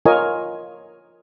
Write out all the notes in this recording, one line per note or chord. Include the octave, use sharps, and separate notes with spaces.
F4 A#4 C#5 D#5 G#5